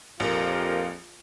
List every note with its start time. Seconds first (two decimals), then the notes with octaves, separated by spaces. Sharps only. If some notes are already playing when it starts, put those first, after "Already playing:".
0.20 A#1 F2 F4 G4 A#4